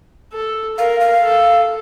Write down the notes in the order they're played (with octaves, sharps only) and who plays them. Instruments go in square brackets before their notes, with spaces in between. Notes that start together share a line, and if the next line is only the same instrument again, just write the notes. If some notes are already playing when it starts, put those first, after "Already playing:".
[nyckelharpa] A4
[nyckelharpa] A#4 [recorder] F5
[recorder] F5
[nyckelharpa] A4